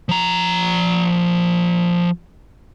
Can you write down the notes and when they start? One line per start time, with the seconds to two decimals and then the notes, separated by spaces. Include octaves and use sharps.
0.09 F3 A#5